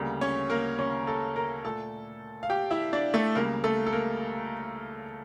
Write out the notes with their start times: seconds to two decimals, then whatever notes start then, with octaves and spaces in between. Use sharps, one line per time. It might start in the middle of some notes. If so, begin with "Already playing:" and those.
Already playing: D2 C#3 G3 A#3
0.21 C#4 C#5
0.50 A#3 A#4
0.79 C#4 C#5
1.07 A4 A5
1.36 A#4 A#5
1.64 A#2 A3 A4 A5
2.43 F5
2.50 G4 G5
2.71 E4 E5
2.93 D4 D5
3.14 A3 A4
3.35 C#2 C#3 G3 A#3 A#4
3.64 A3 A4
3.86 A4
3.93 A#3 A#4